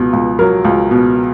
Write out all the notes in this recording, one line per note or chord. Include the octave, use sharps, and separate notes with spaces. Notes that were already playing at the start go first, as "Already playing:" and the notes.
Already playing: C#2 B2
C#2
F#3 A#4
C#2
B2